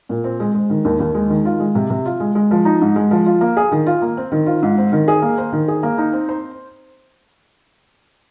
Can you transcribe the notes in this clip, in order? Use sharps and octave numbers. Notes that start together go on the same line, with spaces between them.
A#2
C4
G#3
G#3
D#3
D#2
D#2
G#3
D#3
F4
G#3
C3
C3
F4
G#3
G#3
F3
D#4
G#2
G#3
F3
F4
A#3
G#4
D#3
F4
A#3
C4
D#3
F4
G#2
C4
D#3
G#4
A#3
C5
D#3
G#4
A#3
D#4
C4
C5